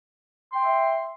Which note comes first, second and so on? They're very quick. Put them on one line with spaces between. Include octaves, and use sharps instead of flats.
C6 G5 E5